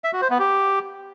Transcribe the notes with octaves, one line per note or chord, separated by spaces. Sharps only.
E5
F#4
C5
B3
G4